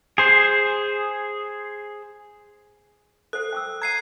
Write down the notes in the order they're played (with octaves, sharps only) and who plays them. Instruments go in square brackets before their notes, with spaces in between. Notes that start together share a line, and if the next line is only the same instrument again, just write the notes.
[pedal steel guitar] G#4 C5
[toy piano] A4 C5 F#5 [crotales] F#6
[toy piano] G5 D6 E6
[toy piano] F#5 A#5 [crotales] G#6 C7 D#7